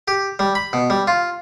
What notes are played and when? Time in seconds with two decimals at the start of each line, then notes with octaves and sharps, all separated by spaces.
0.08 G4
0.39 G3
0.55 B5
0.73 B2
0.90 G3
1.07 F4